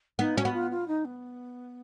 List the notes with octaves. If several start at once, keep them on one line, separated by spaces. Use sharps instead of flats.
B3 D#4
C#4 F#4
B3
F4
F4
D#4
B3